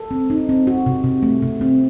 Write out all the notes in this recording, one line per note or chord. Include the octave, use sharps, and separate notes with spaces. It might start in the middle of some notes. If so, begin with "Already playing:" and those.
Already playing: A4
C4
D#4
C4
F#4
C3
C3
A3
C3
C4